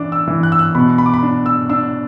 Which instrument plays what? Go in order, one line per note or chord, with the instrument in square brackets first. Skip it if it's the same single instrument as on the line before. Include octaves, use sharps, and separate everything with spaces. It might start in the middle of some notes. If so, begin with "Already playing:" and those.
Already playing: [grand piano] E3 D4 D6
E6
E3
F#6
E6
F#6
B2 B5
B5
D6
B5
D4
E6
D4 E6